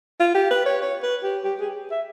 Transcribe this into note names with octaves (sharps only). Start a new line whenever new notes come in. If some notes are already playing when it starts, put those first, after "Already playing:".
F4
G4
B4
C#5
C#5
B4
G4
G4
G#4
E5